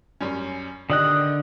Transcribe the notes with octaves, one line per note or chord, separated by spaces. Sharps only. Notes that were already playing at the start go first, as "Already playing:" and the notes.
F#2 G3 C#4
D3 D#3 G4 D5 D#5 D#6 F#6